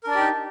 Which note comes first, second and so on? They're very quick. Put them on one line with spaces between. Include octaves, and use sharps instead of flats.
A#4 D4 D5 G4 D#4